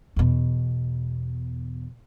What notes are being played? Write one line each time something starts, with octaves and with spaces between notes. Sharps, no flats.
E2 B2